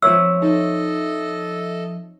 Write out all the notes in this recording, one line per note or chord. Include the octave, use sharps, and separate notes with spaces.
F3 C4 B4 C#5 E5 E6
D#4 A4 D#5